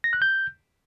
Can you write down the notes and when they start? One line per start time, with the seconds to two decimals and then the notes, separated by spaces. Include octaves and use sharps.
0.04 A#6
0.13 F#6
0.22 G6